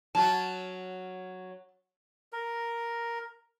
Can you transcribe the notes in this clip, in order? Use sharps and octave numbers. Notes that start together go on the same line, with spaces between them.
F#3 C#4 F#4 A5
A#4